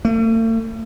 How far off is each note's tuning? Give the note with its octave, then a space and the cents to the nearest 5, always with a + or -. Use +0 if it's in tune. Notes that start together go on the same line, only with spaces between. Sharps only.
A3 +45